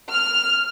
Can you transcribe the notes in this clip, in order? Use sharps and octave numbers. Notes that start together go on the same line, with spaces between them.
F6